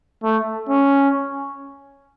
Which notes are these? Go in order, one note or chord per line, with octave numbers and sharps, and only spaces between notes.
A3
C#4